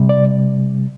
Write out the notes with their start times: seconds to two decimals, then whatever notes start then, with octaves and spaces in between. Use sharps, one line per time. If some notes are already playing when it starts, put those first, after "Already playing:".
Already playing: C3 G3
0.09 D5